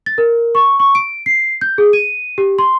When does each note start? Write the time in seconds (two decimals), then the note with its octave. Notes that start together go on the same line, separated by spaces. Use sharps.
0.06 A6
0.18 A#4
0.55 C#6
0.80 C#6
0.95 D7
1.26 C7
1.61 G6
1.78 G#4
1.93 D#7
2.38 G4
2.59 C6